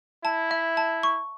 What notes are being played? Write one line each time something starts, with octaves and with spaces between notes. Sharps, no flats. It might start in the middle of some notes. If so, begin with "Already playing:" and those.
E4 A5
E5
A5
C#6